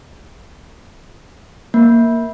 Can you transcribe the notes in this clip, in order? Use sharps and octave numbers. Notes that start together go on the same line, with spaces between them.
A#3